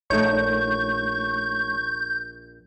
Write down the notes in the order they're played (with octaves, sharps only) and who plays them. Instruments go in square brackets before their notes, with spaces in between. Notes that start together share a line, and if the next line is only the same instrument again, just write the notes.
[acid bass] A#1 [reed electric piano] A3 D#4 C#5 [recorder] C#6 [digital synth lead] G6